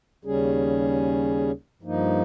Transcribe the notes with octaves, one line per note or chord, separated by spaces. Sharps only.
D#2 C#3 G3 C#4 G#4
G2 F3 A#3 D#4